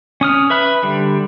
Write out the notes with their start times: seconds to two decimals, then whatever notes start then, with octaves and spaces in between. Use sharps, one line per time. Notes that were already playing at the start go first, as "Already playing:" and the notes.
0.21 C#4 D#6 F6
0.50 B4 E5 B5 F#6
0.83 D3 G3